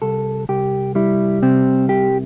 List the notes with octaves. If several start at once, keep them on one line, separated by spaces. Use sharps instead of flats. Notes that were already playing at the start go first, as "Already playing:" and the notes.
C2 A4
C2 G4
G3 E4
C3 C4
C2 G4